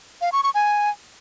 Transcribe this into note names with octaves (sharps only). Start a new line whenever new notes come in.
F5
C#6
C#6
G#5